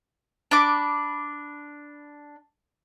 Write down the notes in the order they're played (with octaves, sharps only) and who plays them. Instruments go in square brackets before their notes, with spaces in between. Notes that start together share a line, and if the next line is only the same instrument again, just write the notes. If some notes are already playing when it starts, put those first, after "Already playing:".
[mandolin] D4 B5 D6